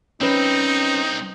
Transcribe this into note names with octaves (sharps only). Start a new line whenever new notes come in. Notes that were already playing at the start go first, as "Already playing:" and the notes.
C2 C4 C#4 D#4 B4